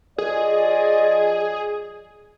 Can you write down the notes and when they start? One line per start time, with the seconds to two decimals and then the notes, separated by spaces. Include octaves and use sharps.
0.18 F3 G#4 D5 D#5